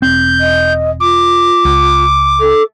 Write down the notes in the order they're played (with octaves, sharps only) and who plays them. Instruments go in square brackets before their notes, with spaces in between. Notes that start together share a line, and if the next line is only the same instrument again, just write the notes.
[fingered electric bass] E1 C4 [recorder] G6
[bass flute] D#5
[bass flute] F4 [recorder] D6
[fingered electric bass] C#2
[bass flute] A4